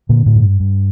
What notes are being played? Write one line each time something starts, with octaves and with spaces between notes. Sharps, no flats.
A#2 D3 A#3
A2 A3
G2
G2